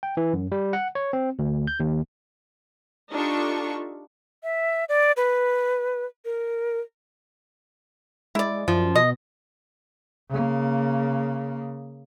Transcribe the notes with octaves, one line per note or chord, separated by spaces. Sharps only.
G5
E3
F#2
G3
F#5
C#5
C4
D2
G6
D#2
D4 D#4 F4 G4 A4 C#6
E5
D5
B4
A#4
G#3 E4 D5
F#2 F3
B2 D#5
C#3 A#3